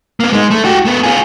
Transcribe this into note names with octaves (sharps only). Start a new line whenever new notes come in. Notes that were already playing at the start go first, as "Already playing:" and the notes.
A#3 B3
G#3 D#4
A3
F#4 G4
A3 B3
F4 G#4